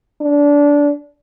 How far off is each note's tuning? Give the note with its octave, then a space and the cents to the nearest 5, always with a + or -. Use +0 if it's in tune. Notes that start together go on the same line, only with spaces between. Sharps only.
D4 -20